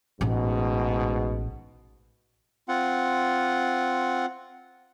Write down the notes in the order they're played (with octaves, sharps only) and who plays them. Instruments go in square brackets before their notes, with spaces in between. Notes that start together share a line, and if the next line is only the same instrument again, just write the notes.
[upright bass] A1 [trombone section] G#2 B2
[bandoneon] C4 F4 F#5